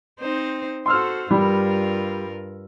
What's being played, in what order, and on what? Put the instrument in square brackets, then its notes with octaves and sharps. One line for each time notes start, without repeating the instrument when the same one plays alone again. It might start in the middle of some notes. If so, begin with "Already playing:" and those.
[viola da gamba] C4 D#4 C5
[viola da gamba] F#4 A4 C5 [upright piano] C6 E6 F6
[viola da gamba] G2 F4 A#4 [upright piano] G3 B5